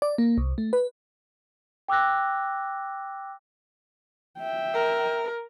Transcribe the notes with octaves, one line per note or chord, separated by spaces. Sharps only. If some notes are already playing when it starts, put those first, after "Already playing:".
D5
A#3
C2
A3
B4
G5 D6 E6 F#6 A#6
E5 G5
A#4